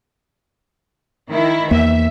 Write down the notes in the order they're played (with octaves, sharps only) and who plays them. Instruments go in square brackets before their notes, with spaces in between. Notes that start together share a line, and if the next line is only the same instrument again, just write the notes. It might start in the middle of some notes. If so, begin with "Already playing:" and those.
[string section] D#3 E4
[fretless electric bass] E2 A#3 [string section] E5